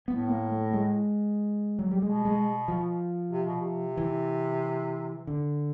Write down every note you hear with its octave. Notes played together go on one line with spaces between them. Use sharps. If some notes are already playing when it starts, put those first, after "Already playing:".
A2 B3
A#3
A3
G#3
F#3
G3
B2 G#3
G#3
F3
C3
B2
C3
E3
D3